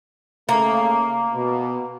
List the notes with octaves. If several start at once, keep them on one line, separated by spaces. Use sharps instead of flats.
C#3 A3 A#3
B2